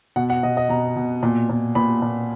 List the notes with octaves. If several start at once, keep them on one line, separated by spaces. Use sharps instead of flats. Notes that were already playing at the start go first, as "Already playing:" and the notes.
B2 F#5
F#5
B2 D#5
D#5
B2 A#5
B2
A#2
A#2
A#2 B5
A#2